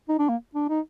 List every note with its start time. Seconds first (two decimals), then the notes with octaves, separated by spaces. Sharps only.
0.09 D#4
0.19 D4
0.29 A#3
0.55 D4
0.69 D#4